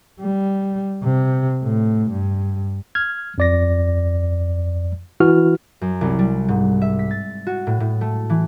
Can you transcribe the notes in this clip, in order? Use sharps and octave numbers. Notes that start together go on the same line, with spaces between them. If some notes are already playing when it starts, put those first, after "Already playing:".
G3
C3
A2
G2
F6 G#6
F2 D5 A#6
E3 E4 F#4 F6
F#2
C2
G3
G#2
E5
B6
A6
F#4
A2
A2
A3
E3